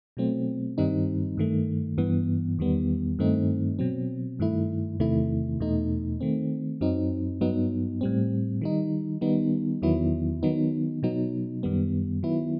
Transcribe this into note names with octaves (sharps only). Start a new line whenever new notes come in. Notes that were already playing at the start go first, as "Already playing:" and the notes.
B2 F#3 A3 C4
G2 D#3 G3 C4 D#4
G2 D#3 A3
G2 E3 B3
E2 D#3 G3 B3
G2 D#3 A3 C4 D#4
B2 F#3 C4
G2 D#3 A3 E4
E2 C3 D#3 A3 E4
E2 B2 A3 D#4
D#3 A3 C4
F#2 F#3 C4 D#4
G2 F#3 B3 D#4
A2 G3 C4
D#3 G3 D#4
D#3 G3 B3 D#4
E2 D#3 F#3 B3 E4
D#3 F#3 B3 D#4
B2 F#3 B3 D#4
F#2 D#3 G3 B3
D#3 F#3 B3 E4